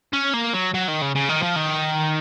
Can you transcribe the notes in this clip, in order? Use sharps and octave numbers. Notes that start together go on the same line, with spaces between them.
C#4
A#3
F#3
F#3
D#3
C#3
C#3
D#3
F3
D#3